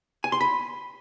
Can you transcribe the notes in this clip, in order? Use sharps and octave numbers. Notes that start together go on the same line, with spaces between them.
G#5
C6
B5